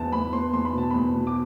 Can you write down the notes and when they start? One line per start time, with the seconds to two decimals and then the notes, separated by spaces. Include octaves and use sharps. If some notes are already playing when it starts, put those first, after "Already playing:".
Already playing: E2 B3 A5
0.12 E2 B5
0.33 B3 C6
0.53 E2 C6
0.65 B5
0.73 B2 A5
0.90 E2 B5
1.14 B2
1.27 D6